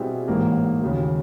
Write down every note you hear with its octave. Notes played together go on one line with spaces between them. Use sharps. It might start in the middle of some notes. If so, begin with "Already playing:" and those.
Already playing: B2 G3 C4 E4 G#4
A1 G#2 E3 G3 A#3
D#2 C#3 F#3